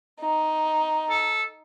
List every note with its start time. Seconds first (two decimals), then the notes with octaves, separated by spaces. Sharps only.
0.21 D#4
1.10 A4